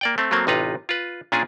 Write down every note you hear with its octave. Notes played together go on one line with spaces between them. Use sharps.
A#3 D5 G5
A3 C4
F#3 A3 A#3 C4
A1 C3 D#4 F4 B4 A#5
F4 B4
A#2 C#4 D4 F4 G#4